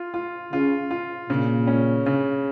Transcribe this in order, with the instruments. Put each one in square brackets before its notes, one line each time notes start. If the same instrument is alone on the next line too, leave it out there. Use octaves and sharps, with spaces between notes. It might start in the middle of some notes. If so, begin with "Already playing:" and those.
Already playing: [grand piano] F4
F4
[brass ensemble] C#3 [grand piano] F4
[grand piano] F4
[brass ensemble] A#2 [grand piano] C#3
[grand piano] C#4
C#3